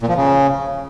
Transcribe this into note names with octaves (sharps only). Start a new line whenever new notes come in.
A#2
F3
C#3